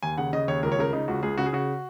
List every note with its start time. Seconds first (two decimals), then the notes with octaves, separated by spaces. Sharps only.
0.03 D#2 G#5
0.18 C#3 F#5
0.33 C#3 D#5
0.48 D#2 C#5
0.63 C#2 A#4
0.72 C#5
0.78 C#3 A#4
0.93 C#3 D#4
1.08 C#2 F#4
1.23 C#2 G#4
1.38 C#3 F#4
1.46 G#4
1.53 C#3 F#4